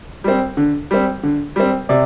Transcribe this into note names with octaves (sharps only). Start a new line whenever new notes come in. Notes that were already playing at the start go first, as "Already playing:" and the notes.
G3 C4
D3
G3 C4
D3
G3 C4
C3 D5